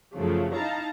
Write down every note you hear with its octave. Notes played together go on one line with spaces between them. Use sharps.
F#2 C#3 F3 F#3 A3
D#4 E4 F5 A5 A#5